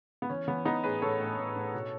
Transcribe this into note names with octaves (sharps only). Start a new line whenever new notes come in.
B3
E3 C#4
E3 B3
E3 B3 D#4
A2 G#4 B4
A2 A4 C#5
A2
A2
A2
B2